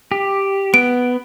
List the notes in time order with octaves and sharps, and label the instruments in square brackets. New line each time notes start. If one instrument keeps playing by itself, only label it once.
[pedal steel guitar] G4
[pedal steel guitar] B3 [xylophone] D7